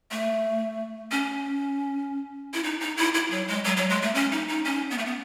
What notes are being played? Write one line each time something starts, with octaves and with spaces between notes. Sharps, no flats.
A3
C#4
E4
D#4
D#4
E4
E4
F#3
G#3
F#3
F#3
G#3
A3
C#4
D#4
D#4
C#4
B3
A3
B3